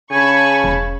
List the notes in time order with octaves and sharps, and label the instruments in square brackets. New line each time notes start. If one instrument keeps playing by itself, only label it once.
[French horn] C#3 [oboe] G#5 [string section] A5 B5 C#6
[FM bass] E1